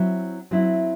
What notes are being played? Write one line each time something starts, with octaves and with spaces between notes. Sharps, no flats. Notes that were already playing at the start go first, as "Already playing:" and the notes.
Already playing: F#3 C4 E4
F#3 C4 E4